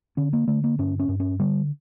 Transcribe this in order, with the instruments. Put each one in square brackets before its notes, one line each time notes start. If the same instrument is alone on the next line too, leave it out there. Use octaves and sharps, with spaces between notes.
[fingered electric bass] D3 C#4
A#3
D3 A3
A#3
G2 C#4
C#4
G2
C#4
D3 G3